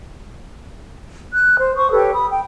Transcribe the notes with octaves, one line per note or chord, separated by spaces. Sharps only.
F#6
C5
C5 C#6 D#6
G4 A4 B4 C#5
B5 D#6
G5